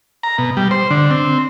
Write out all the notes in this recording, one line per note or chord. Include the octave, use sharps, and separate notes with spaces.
A#5
B2
G3
C5
D3
C4